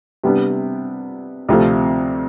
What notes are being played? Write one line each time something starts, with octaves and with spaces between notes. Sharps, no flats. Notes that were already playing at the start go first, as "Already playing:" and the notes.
C3 G3 B3 D4
D2 C3 F3 A3